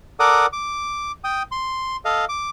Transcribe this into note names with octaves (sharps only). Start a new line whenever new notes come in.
A4 A#4 D5 F#5 D6 D#6
D6
G5 D#6
C6
A4 D#5 F5
D6